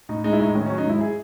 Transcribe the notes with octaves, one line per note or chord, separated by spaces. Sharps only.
A2 D#4
G#3 D#4
E4
A2 D#4
D#3 C#4
C#4
F#3
D#4
G#2 E4
G#4